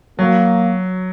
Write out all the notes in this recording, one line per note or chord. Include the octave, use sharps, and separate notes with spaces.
F#3 A#3